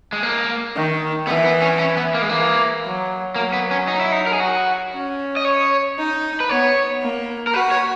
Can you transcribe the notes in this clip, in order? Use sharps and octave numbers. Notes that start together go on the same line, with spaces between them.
G#3
A#3
D#3
E3 B3
B3
C#4
C#4
B3
A#3
G#3
E3 A#3
F#3
F#3 A#3
B3
C#4
D#4
E4
D#4
A#4
G#4
F#4
C#4
D#5
C#5
D#4
B4
B3 C#5
A#3
A#4
F#4 B4
C#5